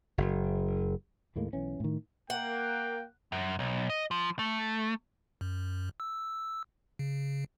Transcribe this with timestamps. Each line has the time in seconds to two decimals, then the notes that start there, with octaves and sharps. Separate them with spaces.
0.18 F#1
1.36 D#2 A2 G#3 A#3
1.53 B1 E3 C#4
1.80 A2 D#3
2.30 A#3 F#5 G5
3.32 F#2
3.59 B1
3.90 D#5
4.11 F3
4.39 A3
5.41 F#2
6.00 E6
6.99 C#3